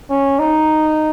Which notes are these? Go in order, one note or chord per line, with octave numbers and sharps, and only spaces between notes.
C#4
D#4